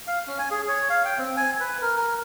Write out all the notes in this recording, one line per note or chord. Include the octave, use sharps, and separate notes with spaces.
F5
C#4
G#5
G#4
C#5
F5
G5
C4
G#5
B4
A#4
A#4